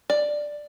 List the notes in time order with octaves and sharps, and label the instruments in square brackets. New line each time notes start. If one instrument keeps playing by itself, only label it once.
[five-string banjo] D5